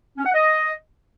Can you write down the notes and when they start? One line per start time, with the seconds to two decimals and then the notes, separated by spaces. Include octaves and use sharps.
0.17 C#4
0.26 F#5
0.34 D#5